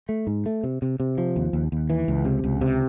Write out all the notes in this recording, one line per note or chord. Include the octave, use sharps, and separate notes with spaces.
A3
G#2
A3
C3
C3
C3
F3
D#2
D#2
D#2
E3
C#2
C3
C#2
C3